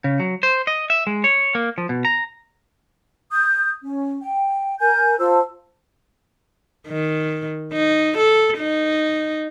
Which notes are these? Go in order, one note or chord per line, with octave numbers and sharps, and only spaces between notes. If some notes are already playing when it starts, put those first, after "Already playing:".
C#3
F#3
C5
D#5
E5
G#3
C#5
A#3
F3
B2
A#5
D#6 G6
C#4
G5
A#4 G#5 G6
F4 C5 A5 E6
D#3
D#4
A4
D#4